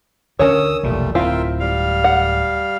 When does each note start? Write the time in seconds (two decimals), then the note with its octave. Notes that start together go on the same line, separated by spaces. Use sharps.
0.39 D2 D3 C#4 D4 A#4 C#5 D#6 E6
0.83 F1 B1 A#2 E3 G3 A3
1.15 D1 C4 E4 F4 A#4 E5 G5
1.60 G3 F5
2.04 F#5